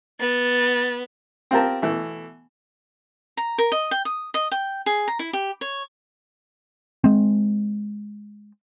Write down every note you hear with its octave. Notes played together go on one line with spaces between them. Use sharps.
B3 A6
C4 F4 G4 A#4 A5
B2 E3 A3
A#5
A#4
D#5
G5
D#6
D#5
G5
G#4
A#5
E4
G4
C#5
G#3 C4